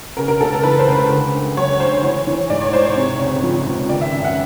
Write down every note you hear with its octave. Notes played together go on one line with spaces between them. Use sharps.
C#3 A#4
A#4
C#2 A4
A#4
E3 B4
C5
C#2
B4
D3
D2
F#3 C#5
D2 C5
E3 C#5
E3
G#2 D5
C#5
G#2 C5
C#5
C3
C#2
F3
C#2
D#3 D5
E5
F#2
F#5